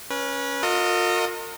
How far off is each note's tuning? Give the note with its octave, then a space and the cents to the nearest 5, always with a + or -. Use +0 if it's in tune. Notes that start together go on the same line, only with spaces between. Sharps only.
C#4 +0 B4 -30
F4 +40 A#4 -40 D#5 +0